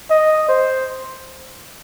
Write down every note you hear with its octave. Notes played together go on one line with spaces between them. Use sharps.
D#5
C5